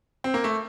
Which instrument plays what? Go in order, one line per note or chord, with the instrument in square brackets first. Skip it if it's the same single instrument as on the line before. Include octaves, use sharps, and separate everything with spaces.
[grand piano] C4
A#3
A3